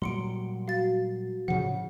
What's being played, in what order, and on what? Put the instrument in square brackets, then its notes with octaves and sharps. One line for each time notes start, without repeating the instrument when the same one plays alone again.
[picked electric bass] A#2 F#3 G3 [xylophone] C6 C#7 D7
[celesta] F#4 [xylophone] F5 A6
[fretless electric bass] A2 C#3 F3 [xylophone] F#5